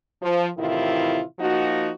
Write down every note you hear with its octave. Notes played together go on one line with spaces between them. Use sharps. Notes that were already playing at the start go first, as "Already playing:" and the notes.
F3
A2 C3 D#3 E3 E4 F4
F3 A#3 D#4 F#4